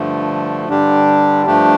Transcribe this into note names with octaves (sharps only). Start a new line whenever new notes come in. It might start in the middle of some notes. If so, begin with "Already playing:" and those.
Already playing: G2 D3 F3 A3
G2 D3 G3 D4 G4
G2 F3 A3 D4 G4